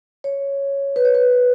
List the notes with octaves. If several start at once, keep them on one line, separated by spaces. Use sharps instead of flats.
C#5
B4
C#5
B4